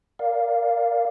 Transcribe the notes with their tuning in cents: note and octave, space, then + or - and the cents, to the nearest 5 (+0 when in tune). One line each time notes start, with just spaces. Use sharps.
A#4 +0 D5 +0 F5 +0